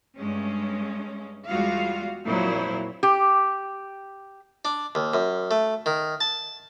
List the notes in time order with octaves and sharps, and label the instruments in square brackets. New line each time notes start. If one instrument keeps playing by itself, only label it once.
[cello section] G2 G#3 A3 C#4
E2 G3 G#3 F4 F#4 F5
F2 A#2 F#3 A#3 E4 C5
[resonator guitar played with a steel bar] G4
[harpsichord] D4
D#2
F#2
A3
D#3
A5